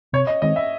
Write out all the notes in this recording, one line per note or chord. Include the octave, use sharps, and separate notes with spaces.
C3 C#5
D#5
D#3 G#3 C4 D#5
E5